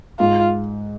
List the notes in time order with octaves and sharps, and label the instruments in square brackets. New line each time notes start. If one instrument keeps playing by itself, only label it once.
[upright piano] G#2 [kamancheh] F4